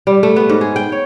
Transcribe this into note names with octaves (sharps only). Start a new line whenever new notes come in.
G3
A3
B3
G#2
G#4
G5
C#5